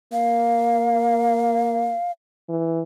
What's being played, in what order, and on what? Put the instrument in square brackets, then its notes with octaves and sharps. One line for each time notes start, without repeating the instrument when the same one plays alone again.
[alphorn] A#3 [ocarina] F5
[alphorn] E3